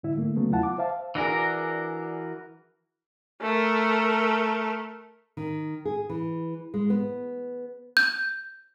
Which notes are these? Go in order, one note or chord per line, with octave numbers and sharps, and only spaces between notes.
G#2 D3 E4 E5
D3 A3 A#3
C#3 F#3 A3 B3
E2 E4 F4 F#5 A5
D6
C5 E5 F5 A5
E3 D4 F#4 G#4 A#4
A3 A#4
D#3
G#4
E3
G#3
B3
G6